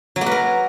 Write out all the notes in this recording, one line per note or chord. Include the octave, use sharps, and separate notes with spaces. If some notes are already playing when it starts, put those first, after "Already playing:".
F#3
A#3
B4
A#4